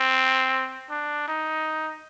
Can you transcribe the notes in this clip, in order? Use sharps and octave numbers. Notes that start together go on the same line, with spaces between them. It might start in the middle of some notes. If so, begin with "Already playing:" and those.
Already playing: C4
D4
D#4